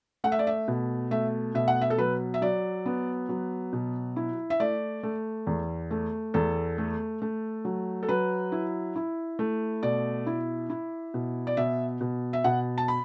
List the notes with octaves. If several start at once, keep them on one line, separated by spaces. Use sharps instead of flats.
A3 F#5
E5
D5
E5
B2
A3 E5
B2 E5
F#5
E5
A4
F#3 B4
E5
F#3 D5
B3
F#3
B2
E4
E5
A3 D5
A3
E2
A3
E2 A4
A3
A3
F#3
A4
F#3 B4
E4
E4
A3
B2 D5
E4
E4
B2
D5
B2 E5
B2
E5
B2 F#5
A5
B5